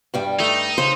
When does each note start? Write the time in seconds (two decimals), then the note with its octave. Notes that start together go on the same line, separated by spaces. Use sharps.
0.14 G2 G3 G5
0.40 A3 D#4
0.78 C#3 C5